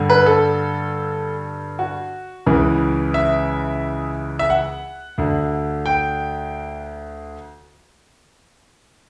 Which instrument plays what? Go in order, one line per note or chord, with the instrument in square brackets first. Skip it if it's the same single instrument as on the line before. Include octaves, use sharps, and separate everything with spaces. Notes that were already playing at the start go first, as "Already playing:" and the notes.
Already playing: [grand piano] G2 D3
B4
A4
F#4
C#2 C#3 E3
E5
E5
F#5
D2 D3
G5